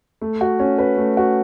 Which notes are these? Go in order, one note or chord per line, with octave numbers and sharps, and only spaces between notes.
A3
F#4
C#4
B4
A3
F#4